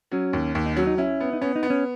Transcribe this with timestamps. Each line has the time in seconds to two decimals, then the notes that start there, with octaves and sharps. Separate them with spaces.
0.12 F#3 C#4
0.33 D#2
0.55 D#2
0.66 D#4
0.76 F#3 C#4
0.87 D#4
0.98 C#4 E4
1.20 B3
1.33 D#4
1.41 B3 C#4
1.56 D#4
1.63 B3
1.70 C#4